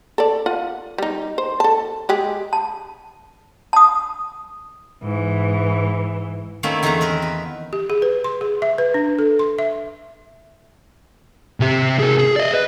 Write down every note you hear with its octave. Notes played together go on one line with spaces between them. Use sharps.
A4 D5
F4 F#5
G3 D#4
C5
A4 A5
G#3 G4 G#4
A5
A5 D#6
G#2 E3
D#3 A3 A#3 C4 C#4 E4
E2 D#3 D#4 B4 A5 A#5
C4 A#4 B4
B4
G4
G#4
B4
C6
G#4
E5
B4
D4
A4
C6
E5
C3 G4
G#4 A#4
G#4
D5 D#5
B4